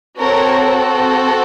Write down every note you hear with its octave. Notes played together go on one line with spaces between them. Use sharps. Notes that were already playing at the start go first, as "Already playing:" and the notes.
C4 F#4 A4 A#4 C#5